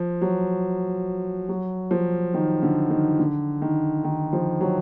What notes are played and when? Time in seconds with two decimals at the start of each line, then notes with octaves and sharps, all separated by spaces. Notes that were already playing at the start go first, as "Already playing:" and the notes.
Already playing: F3
0.21 F#3
1.49 F#3
1.91 F3
2.34 D#3
2.63 D3
2.91 D#3
3.19 D3
3.62 D#3
4.04 D#3
4.33 F3
4.61 F#3